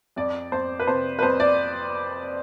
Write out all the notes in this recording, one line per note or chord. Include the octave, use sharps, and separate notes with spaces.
F2 D5
F2 C5
B4
C3 C5
B4
F2 C5
D5